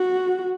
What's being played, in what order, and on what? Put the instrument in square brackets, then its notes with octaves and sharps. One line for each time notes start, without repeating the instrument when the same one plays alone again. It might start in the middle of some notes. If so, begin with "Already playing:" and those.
Already playing: [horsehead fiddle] F#4